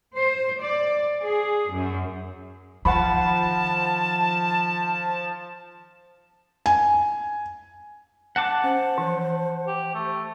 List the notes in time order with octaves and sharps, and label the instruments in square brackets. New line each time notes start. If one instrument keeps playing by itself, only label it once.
[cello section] C5
D5
G#4
F#2
[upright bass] D#3 [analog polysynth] F3 [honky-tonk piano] F#5 B5 [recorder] A5
[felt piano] G#5
[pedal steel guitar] F#5 A5 D6
[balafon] C#4 [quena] C5
[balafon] E3 F3
[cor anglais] G4
A3